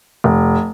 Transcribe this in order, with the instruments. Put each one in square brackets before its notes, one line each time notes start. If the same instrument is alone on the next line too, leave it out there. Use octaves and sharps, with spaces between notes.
[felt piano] F1